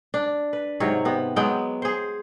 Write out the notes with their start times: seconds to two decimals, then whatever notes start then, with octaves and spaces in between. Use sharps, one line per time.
0.14 D4
0.53 B4
0.80 G#2 C3 F#3 C#5
1.05 C3 B3
1.36 F#3 G#3 B3 G5
1.82 G#4 C5